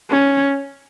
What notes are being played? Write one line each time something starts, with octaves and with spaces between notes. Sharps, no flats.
C#4